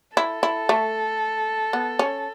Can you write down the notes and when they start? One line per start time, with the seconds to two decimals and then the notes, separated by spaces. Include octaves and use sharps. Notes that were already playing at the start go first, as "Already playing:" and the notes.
0.17 E4 A4
0.43 E4
0.69 A3
1.73 B3
1.99 C#4